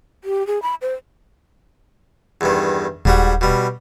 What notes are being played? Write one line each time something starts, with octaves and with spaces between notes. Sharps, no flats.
G4
G#4
B5
C5
E2 G2 D#3
D#1 G#2 G3 F#4
B2 G3